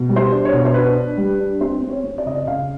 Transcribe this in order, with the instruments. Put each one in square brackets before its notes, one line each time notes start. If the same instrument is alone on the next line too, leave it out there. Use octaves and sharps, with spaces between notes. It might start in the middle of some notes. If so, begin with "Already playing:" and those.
Already playing: [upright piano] B2
G3
C5
D4
C#5
B2
C5
D4 B4
D4
G3
D4
C4 C5
C4
C#5
C4
D5
C#3 D#5
D5
C#3 F5